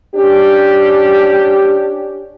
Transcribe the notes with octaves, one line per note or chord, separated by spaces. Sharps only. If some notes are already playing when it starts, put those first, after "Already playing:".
C#4 D4 G4